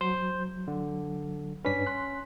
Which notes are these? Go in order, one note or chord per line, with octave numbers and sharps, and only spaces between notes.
F#3 C5 G6
D3
G2 C#4 D4 B4 B6
C6 F#6